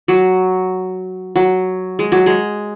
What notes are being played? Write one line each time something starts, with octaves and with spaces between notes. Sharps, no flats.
F#3
F#3
G#3
F#3
G#3